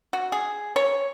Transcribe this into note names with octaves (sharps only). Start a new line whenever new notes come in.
F#4
G#4
C#5